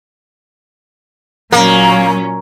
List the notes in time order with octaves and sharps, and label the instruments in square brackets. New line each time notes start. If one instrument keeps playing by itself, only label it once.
[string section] A#2 F#3 C#4 [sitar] A#3 [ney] A#5